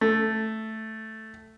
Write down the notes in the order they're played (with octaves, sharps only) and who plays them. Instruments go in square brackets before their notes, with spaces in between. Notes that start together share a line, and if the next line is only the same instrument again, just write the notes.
[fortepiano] A3